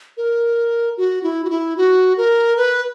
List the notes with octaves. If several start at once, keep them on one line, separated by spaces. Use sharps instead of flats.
A#4
F#4
E4
F#4
E4
F#4
A#4
B4